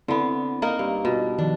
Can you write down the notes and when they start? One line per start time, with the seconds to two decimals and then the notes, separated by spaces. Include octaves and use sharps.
0.08 D3 B3 C4 E4
0.62 A#3 D#4 A#4
0.79 G2
1.05 B2 F4
1.38 D#3 F3 D4